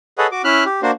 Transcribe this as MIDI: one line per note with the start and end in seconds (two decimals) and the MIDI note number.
0.18 0.27 68
0.18 0.27 69
0.18 0.27 71
0.18 0.27 73
0.18 0.27 75
0.18 0.27 78
0.32 0.42 66
0.32 0.42 86
0.44 0.64 61
0.44 0.64 64
0.44 0.64 76
0.44 0.64 89
0.44 0.64 90
0.66 0.81 67
0.82 0.91 58
0.82 0.91 62
0.82 0.91 66
0.82 0.91 72